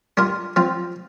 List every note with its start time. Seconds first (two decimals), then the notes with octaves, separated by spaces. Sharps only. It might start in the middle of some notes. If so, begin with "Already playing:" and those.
0.17 G3 D4 F4 A#4
0.56 F3 C4 F4